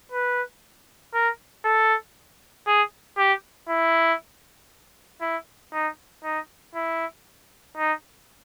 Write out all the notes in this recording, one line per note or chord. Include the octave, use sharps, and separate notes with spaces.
B4
A#4
A4
G#4
G4
E4
E4
D#4
D#4
E4
D#4